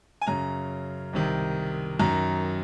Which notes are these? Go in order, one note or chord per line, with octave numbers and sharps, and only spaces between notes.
G#5
F#2 C#3 A#5
C2 C3 D#3
F#2 D#3 A#5